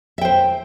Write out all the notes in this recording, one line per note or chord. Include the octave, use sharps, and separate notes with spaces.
C5 E5 G5